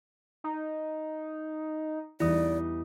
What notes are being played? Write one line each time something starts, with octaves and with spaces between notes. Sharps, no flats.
D#4
E2 G3 D#4 E4 D5 D#6